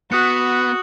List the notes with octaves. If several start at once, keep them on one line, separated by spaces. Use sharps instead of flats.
B3 F#4 D#6 F#6 C#7